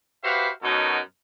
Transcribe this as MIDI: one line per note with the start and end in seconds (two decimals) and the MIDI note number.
0.24 0.49 66
0.24 0.49 67
0.24 0.49 71
0.24 0.49 72
0.24 0.49 76
0.24 0.49 77
0.63 0.98 42
0.63 0.98 47
0.63 0.98 54
0.63 0.98 63
0.63 0.98 69
0.63 0.98 70